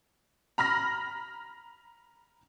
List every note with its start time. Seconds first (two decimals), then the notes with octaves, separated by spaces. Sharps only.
0.58 A#5 B5 F6 A#6